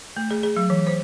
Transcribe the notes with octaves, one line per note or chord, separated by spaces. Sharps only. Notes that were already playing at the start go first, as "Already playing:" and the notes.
A3
G#4
G#4
F#3
E3
C5